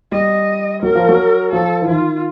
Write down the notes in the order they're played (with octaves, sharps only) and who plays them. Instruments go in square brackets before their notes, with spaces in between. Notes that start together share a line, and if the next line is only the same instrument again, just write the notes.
[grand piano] G3 [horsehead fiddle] D#5
[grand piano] F#3 [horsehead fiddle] A#4
[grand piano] F3
F#3
[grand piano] F3 [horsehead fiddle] A4
[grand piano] E3
[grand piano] D#3 [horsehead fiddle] F4